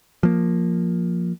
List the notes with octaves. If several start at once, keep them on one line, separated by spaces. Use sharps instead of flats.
F3 A#3